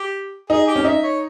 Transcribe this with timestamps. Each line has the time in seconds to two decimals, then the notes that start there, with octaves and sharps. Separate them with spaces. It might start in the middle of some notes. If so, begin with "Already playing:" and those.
Already playing: G4
0.50 D#4 G#4
0.67 G4
0.76 C#4
0.85 D#4 E5
1.03 C#5